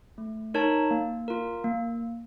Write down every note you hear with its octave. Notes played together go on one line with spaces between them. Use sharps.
A3
D#4 A#4 C#5 A5
A#3
F4 A#4
A#3